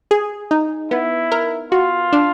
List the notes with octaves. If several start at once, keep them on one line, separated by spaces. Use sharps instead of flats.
G#4
D#4
B3 E4
A#4
F4 F#4
D4